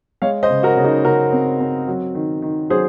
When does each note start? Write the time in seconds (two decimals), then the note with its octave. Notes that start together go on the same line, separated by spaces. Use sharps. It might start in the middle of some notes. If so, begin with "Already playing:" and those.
0.22 G#3 C#5 F5
0.43 C5 D#5
0.50 C#3
0.63 F#4 A#4
0.77 C#3
0.84 D#4 F#4
1.04 C#3 F#4 A#4
1.33 C4
1.60 C4
1.88 F#3
2.15 D#3
2.42 D#3
2.70 F#3 G#4 C5